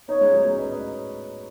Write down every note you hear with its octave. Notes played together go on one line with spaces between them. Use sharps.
B3 D#4 C#5
G#3 C#4
F#3 B3
G#3 C#4
B4 D#5
B4 D#5